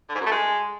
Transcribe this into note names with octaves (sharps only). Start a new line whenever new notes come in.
D3
G#2
F#2
A3
G#3